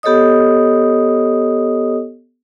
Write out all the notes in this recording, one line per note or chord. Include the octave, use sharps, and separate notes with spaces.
B3 G4 A4 C#5 D#5 D#6